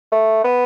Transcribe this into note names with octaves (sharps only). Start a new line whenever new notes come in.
A3
B3